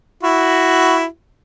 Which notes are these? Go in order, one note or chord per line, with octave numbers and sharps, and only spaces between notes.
E4 F#4